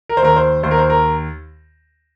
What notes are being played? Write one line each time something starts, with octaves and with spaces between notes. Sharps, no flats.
A#4
C5
D#2 A#4
C5
D#2 C5
A#4
C5
A#4